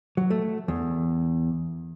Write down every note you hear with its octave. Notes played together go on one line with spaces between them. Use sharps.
F#3
A3
E2